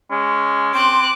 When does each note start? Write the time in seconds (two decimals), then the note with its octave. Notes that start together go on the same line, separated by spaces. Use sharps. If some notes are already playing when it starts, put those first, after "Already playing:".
0.10 G#3 C#4
0.74 C4 C6 D6 F#6